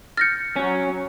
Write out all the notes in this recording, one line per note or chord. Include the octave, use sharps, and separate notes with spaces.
F6 G6 A6 A#6 C#7
F#3 C#4